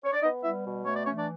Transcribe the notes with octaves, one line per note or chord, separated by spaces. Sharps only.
C#5
D5
B3 D#4 D#5
G3 E4 E5
B2
A3 C#5
D5
E3 C#4 C#5
D4 D5